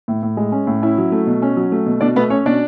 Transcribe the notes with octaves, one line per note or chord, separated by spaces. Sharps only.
A2
A2
G#3
C#4
A2
C#4 E4 E5
F#3
A3
B2
C#4
F#3
A3
B2
B2 D4 D5
A3 B3 B4
C#4 C#5
B2 D4 D5